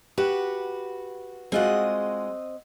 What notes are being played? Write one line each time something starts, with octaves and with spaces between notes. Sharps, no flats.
F#4 G4 B4
G#3 C4 F4 F#4 D#5 F#5